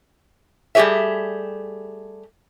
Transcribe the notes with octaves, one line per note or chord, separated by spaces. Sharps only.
G3 A3 G4 G#4 C#5 E5